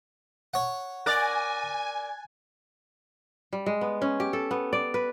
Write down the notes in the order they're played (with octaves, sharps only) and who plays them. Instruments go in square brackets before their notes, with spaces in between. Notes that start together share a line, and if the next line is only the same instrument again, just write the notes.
[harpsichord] C#5 F#5
[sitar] A#4 D5 [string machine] G#5 [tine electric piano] F#6 A6
[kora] G3
G#3
B3
C#4
G4
A4
B3
D5
B4